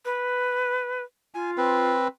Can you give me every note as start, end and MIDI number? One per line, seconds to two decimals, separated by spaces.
0.05 1.02 71
1.34 1.95 65
1.34 1.51 80
1.57 2.08 60
1.57 2.08 71